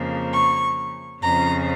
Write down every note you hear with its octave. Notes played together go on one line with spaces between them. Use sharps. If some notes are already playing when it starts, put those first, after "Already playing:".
Already playing: F2 C#3 F3 A#3
C#6
F2 C#3 F3 C#4 A#5